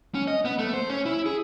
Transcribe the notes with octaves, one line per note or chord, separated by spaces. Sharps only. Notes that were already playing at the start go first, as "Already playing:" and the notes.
C#4
D#5
B3
A3
C5
C#4
E4
G#4